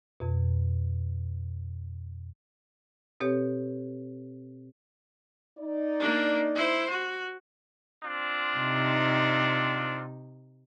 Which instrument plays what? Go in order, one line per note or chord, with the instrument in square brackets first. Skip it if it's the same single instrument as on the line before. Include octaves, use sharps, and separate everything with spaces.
[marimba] F2 B2
B2 C4 G4 A4 C#5
[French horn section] D#4 D5
[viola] A#3 D4
E4 C5
F#4
[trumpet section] C4 D4 F4
[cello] C3 D#4